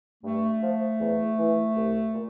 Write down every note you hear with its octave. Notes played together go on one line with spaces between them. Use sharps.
G2 A3
F3
E2
E3
C2
A#2